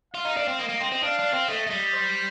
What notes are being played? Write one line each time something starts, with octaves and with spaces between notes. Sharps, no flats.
F4 F5
D#4
D4
C4
A#3 D#5
A#3
C4
C4
D4 F5
D4
C4
A3 D#5
A3
G3
C5